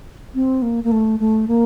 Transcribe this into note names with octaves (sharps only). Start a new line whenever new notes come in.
C4
A#3
A#3
A3
A3
A#3